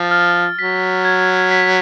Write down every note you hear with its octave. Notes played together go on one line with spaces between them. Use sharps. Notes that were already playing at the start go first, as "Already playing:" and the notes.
Already playing: F3 A6
F6
F#3 B6
G#6
B6